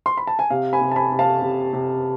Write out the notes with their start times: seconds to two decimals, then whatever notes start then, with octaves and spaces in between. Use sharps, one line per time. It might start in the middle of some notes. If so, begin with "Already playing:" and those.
0.06 C6
0.17 B5
0.27 A5
0.39 G#5
0.50 C3 F5
0.73 G#5 B5
0.81 C3
0.92 A5
0.96 G#5 B5
1.12 C3
1.19 F5 A5
1.42 C3
1.73 C3